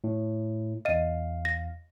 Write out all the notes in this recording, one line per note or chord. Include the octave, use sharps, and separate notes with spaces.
A2
E2 D#5 F5 D#7
A#6